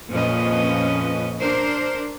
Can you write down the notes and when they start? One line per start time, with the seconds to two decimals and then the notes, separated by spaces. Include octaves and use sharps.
0.12 F2 A#2 F3 C#4 B4 D#5
1.39 D4 A#4 C5